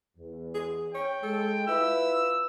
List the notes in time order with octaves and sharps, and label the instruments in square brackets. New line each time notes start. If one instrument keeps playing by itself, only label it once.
[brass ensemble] E2
[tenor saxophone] G#4
[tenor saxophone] C#5 [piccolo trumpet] G5
[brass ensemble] G#3 [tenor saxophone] A4
[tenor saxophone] E4 [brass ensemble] F4 B4 [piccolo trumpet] E6